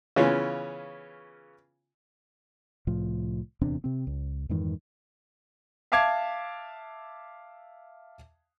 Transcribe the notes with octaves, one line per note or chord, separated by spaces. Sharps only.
C#3 E3 B3 C#4 F4
C2 A2 F3
D1 E2 C3 D4
C3 C4
C#2
F2 G#2 D#3 E3
E5 F5 A5 D6 G#6 C7